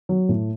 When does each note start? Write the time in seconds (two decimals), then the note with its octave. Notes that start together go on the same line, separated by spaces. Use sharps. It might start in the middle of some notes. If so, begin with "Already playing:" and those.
0.09 F#3
0.29 A2